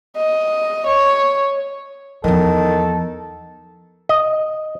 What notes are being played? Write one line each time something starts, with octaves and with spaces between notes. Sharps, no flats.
D#5
C#5
E2 D#3 F3 A4
D#5